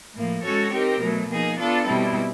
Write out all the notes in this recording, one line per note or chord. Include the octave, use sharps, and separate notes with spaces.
A2 F3 A#3
G#3 C#4 F#4 A4 C#5
C4 D#4 G4 A#4
B2 F#3 A3
F3 A#3 D#4 G#4
B3 D4 F4 A4
B2 G3 C4 E4